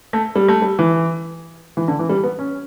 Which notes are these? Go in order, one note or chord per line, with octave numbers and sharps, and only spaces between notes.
A3
G3
A3
G3
E3
E3
D3
E3
G3
B3
C#4